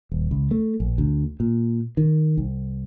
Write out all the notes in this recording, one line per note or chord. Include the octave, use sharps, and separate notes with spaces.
D#1
C#2
A3
A#1
D2
A#2
D#3
C2